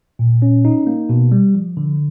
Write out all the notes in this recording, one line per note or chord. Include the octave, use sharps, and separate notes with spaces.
A#2
C#4
D#4
A#3
B2
G3
F3
D3